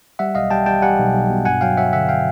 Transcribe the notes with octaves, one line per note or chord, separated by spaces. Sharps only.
G3 E5 F#5
B1 D#5 F5
G3 G5 A5
G3 G5 A5
G3 F#5 G#5
B1
B1
B2
G2 F#5 G#5
F#3 F5 G5
F#3 E5 F#5
D3 E5 F#5
F5 G5